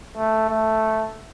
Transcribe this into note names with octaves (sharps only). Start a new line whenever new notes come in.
A3
A3